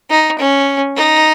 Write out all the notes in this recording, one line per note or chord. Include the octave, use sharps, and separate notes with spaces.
D#4
C#4
D#4